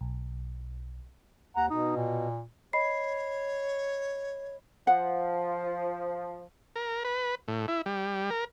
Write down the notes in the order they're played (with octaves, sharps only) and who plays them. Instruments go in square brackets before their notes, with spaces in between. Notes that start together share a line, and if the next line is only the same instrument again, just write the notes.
[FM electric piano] B1
[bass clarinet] D#2 [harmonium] F#5 A#5
[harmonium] B2 [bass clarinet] D#4
[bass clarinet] A#2
[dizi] C#5 [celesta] D#5 B5 C7
[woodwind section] F3 [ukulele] F#5
[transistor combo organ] A#4
B4
A2
E4
G3
A#4